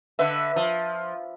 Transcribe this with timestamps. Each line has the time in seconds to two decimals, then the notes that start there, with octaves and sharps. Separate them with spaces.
0.19 D3 B4 E5
0.56 F3